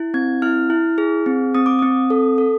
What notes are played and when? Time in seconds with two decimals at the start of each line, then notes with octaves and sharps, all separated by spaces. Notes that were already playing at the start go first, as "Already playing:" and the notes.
Already playing: E4
0.14 C4 G#6
0.42 E4 F6
0.70 E4
0.98 G#4
1.26 C4
1.55 C4 D#6
1.66 D6
1.79 C4 D#6
2.10 A4
2.38 A4